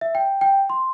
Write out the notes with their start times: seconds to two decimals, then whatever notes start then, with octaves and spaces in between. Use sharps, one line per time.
0.01 E5
0.15 G5
0.41 G5
0.70 C6